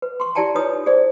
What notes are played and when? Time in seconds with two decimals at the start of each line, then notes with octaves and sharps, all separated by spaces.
0.02 B4
0.20 C6 C#6
0.35 E4 G4 D5 G5 A5 A#5
0.55 D#4 F4 B4 C#5 D#6
0.86 G#4 C5 D5